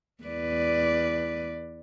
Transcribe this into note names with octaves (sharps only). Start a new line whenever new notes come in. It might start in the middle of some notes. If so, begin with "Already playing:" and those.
E2 B4 D5